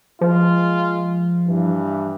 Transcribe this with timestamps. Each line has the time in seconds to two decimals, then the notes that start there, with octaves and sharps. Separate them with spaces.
0.21 F3 G#3 F4
1.48 G2 E3